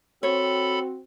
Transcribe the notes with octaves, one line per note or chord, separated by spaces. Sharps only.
C4 F#4 A4 C#5 B5